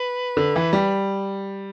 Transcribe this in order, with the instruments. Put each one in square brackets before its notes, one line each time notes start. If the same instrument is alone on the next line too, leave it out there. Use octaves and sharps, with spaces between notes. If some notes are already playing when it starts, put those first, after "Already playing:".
Already playing: [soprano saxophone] B4
[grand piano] D3
E3
G3